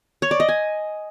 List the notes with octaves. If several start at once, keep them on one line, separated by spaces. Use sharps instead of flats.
C#5
D5
D#5
G#5